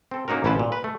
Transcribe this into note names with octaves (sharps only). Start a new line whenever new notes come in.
C4 A4
A#3 C#4 D#4 F#4 A#4
A1 C#4 E4 B4 C5 A5
A#2
B4
A3